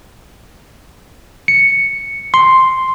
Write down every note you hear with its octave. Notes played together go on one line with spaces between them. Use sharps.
C#7
C6